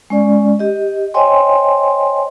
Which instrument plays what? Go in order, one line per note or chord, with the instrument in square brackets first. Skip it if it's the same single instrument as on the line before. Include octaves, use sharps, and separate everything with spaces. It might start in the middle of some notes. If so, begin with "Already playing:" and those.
[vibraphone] G#3 C#4 D5
G4 D#5
C5 C#5 D#5 G5 G#5 C6